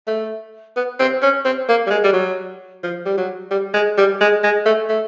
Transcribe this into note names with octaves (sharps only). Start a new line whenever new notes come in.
A3
B3
C4
C#4
C4
A#3
G3
G#3
G3
F#3
F3
G3
F#3
G3
G#3
G3
G#3
G#3
A3
A3